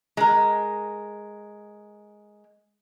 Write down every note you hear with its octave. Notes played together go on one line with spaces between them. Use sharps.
G#3 A#4